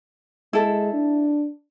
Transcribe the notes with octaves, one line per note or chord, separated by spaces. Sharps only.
G#3 E4 A4
D4